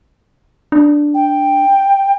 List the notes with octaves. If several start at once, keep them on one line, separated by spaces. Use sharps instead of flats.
D4
G5